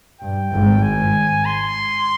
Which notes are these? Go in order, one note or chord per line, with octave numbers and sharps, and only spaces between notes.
G2 G5
G#1 G#2
G#5
C6